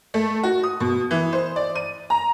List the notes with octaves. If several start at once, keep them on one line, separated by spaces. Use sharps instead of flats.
A3
F#4
D#6
B2
E3
C5
D5
D#7
A#5